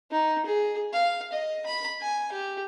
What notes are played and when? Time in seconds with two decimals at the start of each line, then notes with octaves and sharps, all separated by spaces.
0.11 D#4
0.46 G#4
0.93 F5
1.33 D#5
1.66 B5
2.01 G#5
2.32 G4